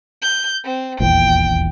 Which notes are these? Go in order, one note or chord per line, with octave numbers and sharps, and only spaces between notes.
G6
C4
D#1 A#1 E2 G5